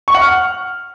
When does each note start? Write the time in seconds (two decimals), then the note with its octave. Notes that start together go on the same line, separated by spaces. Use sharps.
0.08 C#6
0.14 F#5
0.21 F6